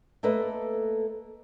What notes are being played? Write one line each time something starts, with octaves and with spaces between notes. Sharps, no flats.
A3 A#3 A4 B4 D#5